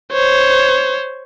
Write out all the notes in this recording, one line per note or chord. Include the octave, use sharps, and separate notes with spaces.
C5 C#5